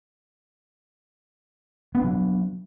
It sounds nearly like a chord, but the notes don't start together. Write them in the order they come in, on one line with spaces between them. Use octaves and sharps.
B3 D4 F#3